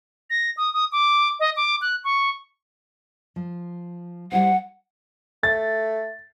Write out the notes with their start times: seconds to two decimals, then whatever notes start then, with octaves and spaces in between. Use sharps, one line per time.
0.30 A#6
0.57 D#6
0.74 D#6
0.92 D6
1.40 D#5
1.56 D6
1.82 F#6
2.04 C#6
3.36 F3
4.32 G3 E4 C5 F#5
5.43 A3 A6